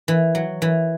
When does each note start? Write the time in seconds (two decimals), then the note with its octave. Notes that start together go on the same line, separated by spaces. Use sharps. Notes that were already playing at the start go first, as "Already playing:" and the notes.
0.08 E3
0.35 F#3
0.62 E3